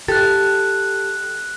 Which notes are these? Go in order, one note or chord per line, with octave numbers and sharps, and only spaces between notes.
G4 A4 F#6 A6